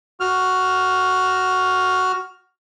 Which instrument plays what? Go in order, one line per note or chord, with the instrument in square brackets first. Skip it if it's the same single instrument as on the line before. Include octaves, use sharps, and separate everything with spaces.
[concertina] F#4 F6